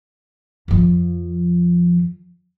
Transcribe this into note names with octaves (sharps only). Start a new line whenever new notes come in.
F2 F3